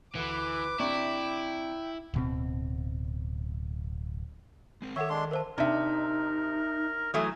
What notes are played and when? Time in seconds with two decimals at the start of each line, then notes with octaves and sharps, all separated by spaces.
0.15 D2 E3 B4 D6
0.80 C3 D4 E4 G5 C#6
2.14 D1 B2 C4
4.82 G#3 C4 A#4
4.96 D#3 A4 C#5 E5 F#5 C#6
5.10 G#3 D4 C6
5.31 A#4 C5 E5 A5
5.58 C3 D4 D#4 A#4 E5
7.14 E3 F#3 A3 D#6